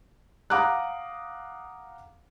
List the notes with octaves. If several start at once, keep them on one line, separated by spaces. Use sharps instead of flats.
F5 F#5 A#5 D6 D#6 F#6